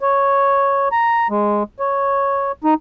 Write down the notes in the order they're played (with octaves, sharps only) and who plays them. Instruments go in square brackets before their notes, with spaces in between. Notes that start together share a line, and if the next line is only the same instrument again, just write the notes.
[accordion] C#5
A#5
G#3
C#5
D#4